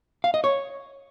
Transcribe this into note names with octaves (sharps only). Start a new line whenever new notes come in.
F5
D#5
C#5